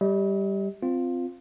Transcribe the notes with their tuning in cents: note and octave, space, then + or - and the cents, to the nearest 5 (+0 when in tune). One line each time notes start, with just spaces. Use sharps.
G3 +0 D#5 +45
C4 -15 F4 +0